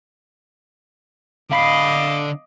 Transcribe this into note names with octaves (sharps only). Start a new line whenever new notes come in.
D3 D#5 F5 B5 D6 B6 C7